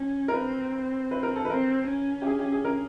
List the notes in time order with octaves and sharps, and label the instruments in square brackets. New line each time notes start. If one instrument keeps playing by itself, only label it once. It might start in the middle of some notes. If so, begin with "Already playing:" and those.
Already playing: [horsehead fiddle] C#4
[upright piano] A#4
[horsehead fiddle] C4 [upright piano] B4
[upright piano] B4
A#4
A4
B4
[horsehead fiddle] C4 [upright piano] A#4
[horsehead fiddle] C#4
[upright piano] G4
G#4
G4
G#4
A#4